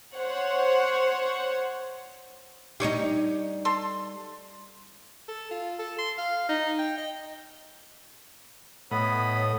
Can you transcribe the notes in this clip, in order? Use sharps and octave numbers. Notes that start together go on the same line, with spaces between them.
C5 C#5 F#5
G3 D4 D#4 C#5 D#5
A4 C6
A4
F4
A4
C6
F5
D#4
G5
D#5
A2 B3 C#5 D#5 B5